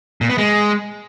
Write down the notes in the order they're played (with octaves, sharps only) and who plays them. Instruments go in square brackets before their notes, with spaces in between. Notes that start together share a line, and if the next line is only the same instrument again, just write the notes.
[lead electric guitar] A#2
B3
G#3